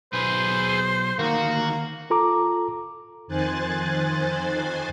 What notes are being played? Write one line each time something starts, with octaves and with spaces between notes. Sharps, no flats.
B1 G#4 B4 C5
D2 D#3 A#3 F#4
F4 A4 A#5 D6
F2 D#3 C5 G#5 F#6 A6